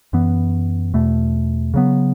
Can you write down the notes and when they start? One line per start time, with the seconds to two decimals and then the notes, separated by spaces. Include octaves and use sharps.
0.13 F#2 E3 B3
0.94 E2 B2 A3
1.74 C#3 F#3 B3